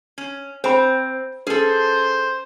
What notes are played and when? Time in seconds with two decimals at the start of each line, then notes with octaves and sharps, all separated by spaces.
0.18 C#4
0.64 C4 C5 G5 B5
1.47 C#4 G#4 A4 B4 C5